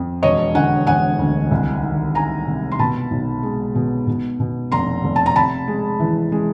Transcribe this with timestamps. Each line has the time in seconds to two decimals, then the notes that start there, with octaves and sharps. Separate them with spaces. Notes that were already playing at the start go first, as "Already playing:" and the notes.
Already playing: F2
0.23 E1 C#5 D#5
0.55 D3 F#5 G#5
0.87 E1 F#5 G#5
1.19 D2
1.51 C2
1.83 D#3
2.15 D#3 G#5 A#5
2.47 C3
2.72 C6
2.79 B2 A5 B5
3.11 B1
3.43 G#3
3.75 B2
4.07 B2
4.40 B2
4.71 F1 A#5 C6
5.03 F1
5.16 A5
5.26 A#5
5.36 C3 A5 B5
5.68 G#3
6.00 E3
6.32 G#3